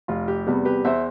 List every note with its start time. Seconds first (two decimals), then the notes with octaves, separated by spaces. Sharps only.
0.08 F1 F4
0.28 G4
0.46 E2 C3 G3 B3
0.65 G4 B4
0.85 E2 C5 E5